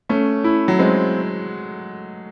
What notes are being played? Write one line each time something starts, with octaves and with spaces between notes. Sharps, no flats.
A3 C#4
E4
F#3
G#3 C4